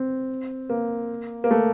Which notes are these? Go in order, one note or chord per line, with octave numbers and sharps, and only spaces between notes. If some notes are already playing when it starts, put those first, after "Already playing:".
Already playing: C4
A#3
A#3
A3